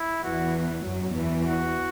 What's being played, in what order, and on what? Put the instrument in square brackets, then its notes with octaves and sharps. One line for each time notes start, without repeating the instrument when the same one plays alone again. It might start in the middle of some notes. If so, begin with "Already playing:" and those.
Already playing: [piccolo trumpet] E4
[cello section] E2 E3 [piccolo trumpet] F#4
[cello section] F#2 F#3
E2 E3
[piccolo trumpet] F#4